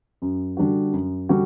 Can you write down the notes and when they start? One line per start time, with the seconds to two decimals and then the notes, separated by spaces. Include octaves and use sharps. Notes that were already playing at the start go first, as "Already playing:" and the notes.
0.22 F#2
0.57 D3 G3 D4 F#4
0.93 F#2
1.29 D3 G3 D4 F#4